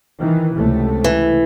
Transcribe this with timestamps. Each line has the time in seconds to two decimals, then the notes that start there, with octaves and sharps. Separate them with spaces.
0.18 D#3 E3
0.55 C#2 C3 A3
1.04 E3